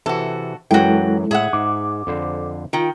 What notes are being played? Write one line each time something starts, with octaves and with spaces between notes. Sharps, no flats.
C3 E3 F#4 A4
F#2 E3 F#3 G#3 E4 F#4 A4 G5
A2 G#4 E5 F#5
G#2 D6
F2 D3 C5
D#3 F4 G5